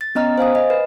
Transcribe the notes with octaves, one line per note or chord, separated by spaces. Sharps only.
A6
B3 C#4 D#5 A#5 F6
C5 F5 G#5 D#6
D#5
B4